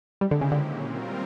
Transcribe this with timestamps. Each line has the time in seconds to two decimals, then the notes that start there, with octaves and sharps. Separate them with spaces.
0.21 D#3 G3 G#3 C4 E4 G4
0.31 D3
0.41 C#3
0.51 A#2 D3 F#3 A#3 C#4
0.82 G3 C4 F4 A#4